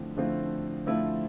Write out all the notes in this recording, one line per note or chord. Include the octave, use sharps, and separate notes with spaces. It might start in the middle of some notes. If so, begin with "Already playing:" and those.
Already playing: D3 F3 A3 C4 E4
D3 F3 A3 C4 E4
D3 F3 A3 C4 E4